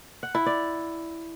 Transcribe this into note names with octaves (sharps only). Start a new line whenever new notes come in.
F#5
E4
D5